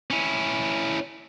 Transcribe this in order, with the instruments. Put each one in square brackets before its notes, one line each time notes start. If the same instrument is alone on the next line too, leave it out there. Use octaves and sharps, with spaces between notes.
[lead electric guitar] C#4 E4